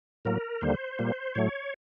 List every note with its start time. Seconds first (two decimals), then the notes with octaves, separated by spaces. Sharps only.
0.25 A2 F#3 A#3 A#4
0.61 D#2 D3 G3 A#3 C5
0.99 A#2 G3 A#3
1.35 A2 F#3 A3 C#5